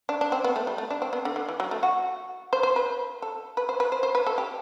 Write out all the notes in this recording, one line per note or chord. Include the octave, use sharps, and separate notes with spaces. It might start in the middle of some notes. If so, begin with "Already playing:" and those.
D4
D4
C4
B3
A3
G3
A3
D4
C4
B3
D3
D3
E3
F#3
A3
F#4
C5
C5
B4
A4
B4
C5
B4
C5
C5
B4
A4
G4